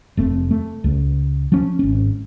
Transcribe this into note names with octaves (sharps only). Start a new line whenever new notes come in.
F1 A3 C4
A3
C#2
F3 C#4
G#1 C#4